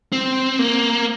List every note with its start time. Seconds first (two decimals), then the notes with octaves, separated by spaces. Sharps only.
0.12 C4
0.59 A#3